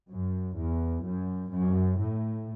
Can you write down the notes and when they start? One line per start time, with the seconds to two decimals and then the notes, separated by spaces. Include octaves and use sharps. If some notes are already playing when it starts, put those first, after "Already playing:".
0.10 F#2
0.57 E2
1.05 F#2
1.52 F#2
2.00 A2